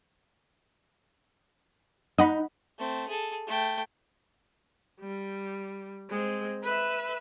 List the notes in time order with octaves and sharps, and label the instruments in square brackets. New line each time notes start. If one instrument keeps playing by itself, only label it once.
[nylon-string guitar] D#4 [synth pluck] D#5 F#5 B5
[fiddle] A3 C4
G#4 A4
A3 G5
[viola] G3
G#3 C4
B4 E5